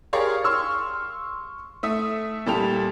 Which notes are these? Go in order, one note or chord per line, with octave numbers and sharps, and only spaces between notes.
G4 G#4 A#4 C#5 D5 F5
C6 C#6 E6 F6
A3 E5 D#6
A#2 G3 A4 G5 F7